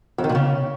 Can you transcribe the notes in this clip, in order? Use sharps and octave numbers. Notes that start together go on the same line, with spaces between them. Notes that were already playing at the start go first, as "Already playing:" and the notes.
F2
D#3
A#2
C#3